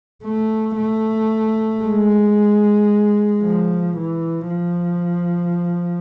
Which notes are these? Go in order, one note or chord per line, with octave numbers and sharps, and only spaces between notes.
A3
A3
G#3
F3
E3
F3